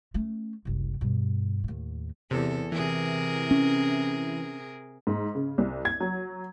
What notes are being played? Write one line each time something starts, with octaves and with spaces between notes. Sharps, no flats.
A3 C#4
F#1 C2
G2 B2
D#2 A2
E2 C3 A4
C3 E3 G#4 A#4
C#4
G#2
C#3
C2
G#6
F#3